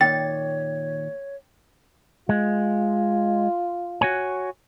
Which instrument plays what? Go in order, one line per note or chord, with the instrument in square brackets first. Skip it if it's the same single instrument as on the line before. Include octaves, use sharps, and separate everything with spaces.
[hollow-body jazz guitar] A#2 D#3 [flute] C#5 [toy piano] G5 [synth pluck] A6
[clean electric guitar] G#3 [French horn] F4
[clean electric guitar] F#4 C#5 G#5